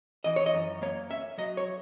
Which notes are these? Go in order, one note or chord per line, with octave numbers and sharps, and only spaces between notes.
E3 D#5
C#5
D#5
F#2
A#3 C#5
C#4 E5
F#3 D#5
C#5